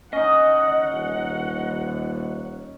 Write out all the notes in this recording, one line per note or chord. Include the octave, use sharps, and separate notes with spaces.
C#4 D#4 D#5 F#5
D#1